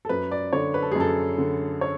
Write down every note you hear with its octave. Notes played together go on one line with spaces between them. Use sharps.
A4
F#2 B4
D5
D3 C#5
B4
A4
G#4
F#2 A4
D3
C#5